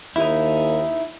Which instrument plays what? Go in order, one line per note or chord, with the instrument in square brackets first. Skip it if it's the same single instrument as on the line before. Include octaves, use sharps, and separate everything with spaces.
[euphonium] D#2 [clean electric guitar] D#4 E4